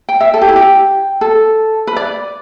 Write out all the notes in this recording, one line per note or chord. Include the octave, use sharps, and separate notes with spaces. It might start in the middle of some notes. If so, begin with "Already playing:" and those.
G5
E5
A4
G4
E4
G4
A4
B4
D5